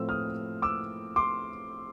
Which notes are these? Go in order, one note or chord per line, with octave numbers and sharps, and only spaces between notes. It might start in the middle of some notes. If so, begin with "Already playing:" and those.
Already playing: A2 F3 A3 C4 E6
D#6 F6
D6 E6
C6 D6